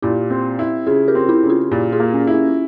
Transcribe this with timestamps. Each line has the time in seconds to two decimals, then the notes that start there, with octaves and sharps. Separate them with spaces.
0.02 A#2 E4 G4
0.30 C4
0.59 E4
0.87 C#3 F4 G#4
1.08 G4 A#4
1.15 C4
1.29 E4 G4
1.43 C#3
1.50 F4 G#4
1.71 A#2 E4 G4
1.92 F4 G#4
2.00 A#3
2.14 C#4
2.27 E4
2.34 C#4